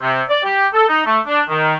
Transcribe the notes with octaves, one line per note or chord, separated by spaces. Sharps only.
C3
D5
G4
A4
D#4
A3
D4
D#3